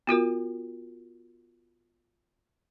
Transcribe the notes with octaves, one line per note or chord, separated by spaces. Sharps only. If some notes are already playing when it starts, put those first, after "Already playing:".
B3 F4 F#4 A#4